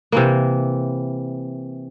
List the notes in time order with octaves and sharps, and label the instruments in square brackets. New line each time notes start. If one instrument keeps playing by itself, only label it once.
[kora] C3 E3 A#3